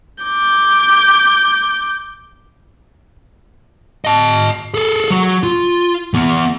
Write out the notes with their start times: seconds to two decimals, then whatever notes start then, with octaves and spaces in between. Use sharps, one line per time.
0.24 D6 G6
4.05 D#5 A5
4.74 G#4 A4
5.10 F#3 F#4
5.43 F4
6.14 E3 B3